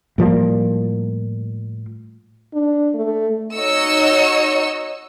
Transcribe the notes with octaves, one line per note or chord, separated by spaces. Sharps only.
A2 F3 G3 A#3
D4
A3
D#4 F#4 C#5 D#5 E6 C#7